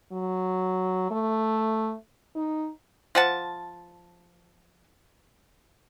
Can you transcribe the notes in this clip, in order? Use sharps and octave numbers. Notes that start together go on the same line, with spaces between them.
F#3
A3
D#4
F3 F#5 A5